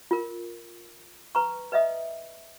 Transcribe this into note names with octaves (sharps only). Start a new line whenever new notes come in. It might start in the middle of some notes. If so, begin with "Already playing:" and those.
F4 A#4
B4 A#5 C#6
B4 D#5 E5 D#6